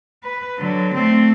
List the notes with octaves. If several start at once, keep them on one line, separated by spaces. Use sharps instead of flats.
B4
D3 F#3
A3 C4